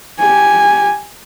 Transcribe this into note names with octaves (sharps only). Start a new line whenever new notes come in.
G4 G#5